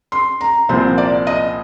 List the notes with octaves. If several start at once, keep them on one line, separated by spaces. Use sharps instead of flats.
C6
A#5
C2 A#2 F3 C4 C5
D5
D#5